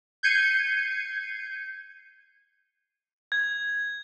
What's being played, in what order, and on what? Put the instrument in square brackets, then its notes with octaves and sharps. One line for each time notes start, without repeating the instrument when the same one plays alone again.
[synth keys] G6 G#6 C7 C#7 D#7
[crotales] G#6